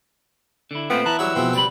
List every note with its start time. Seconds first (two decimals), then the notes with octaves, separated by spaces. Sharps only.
0.71 D3 E4
0.90 A#2 A3 B3 C4 F4 G5
1.05 E2 E4 A5 A#5 F#6
1.19 F#3 G3 G#4 F#5 E6
1.35 B2 F3 G#3 C4
1.53 C#2 G3 B4 B5